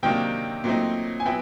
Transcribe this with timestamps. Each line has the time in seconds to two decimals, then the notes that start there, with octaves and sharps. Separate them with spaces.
0.03 C3 D#3 F#3 A#3 D4 G5
0.64 A#2 F#3 A3 C4 D#4
1.20 G#5
1.25 F#3 B3 E4 G5